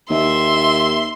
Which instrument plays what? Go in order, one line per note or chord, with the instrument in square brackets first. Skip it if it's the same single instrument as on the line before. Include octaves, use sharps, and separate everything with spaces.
[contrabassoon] D#2 [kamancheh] E5 [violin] C6